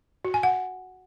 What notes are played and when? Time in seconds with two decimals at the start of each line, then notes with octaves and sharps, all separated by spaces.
0.25 F#4
0.34 G#5
0.43 F#5